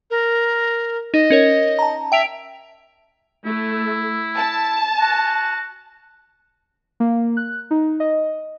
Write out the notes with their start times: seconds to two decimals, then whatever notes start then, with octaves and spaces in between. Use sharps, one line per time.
0.11 A#4
1.14 D#4 D#5
1.30 C#4 A#4 C#5
1.79 A5 A#5
2.12 E5 G5 D7 F7
3.45 A3 E4
4.36 A5
5.00 F#4
7.00 A#3
7.37 F#6
7.71 D#4
8.00 D#5